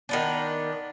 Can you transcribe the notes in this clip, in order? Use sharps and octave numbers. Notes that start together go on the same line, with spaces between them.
D#3 B3 D4